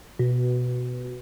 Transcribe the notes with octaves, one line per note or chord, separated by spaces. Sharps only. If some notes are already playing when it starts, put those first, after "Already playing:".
B2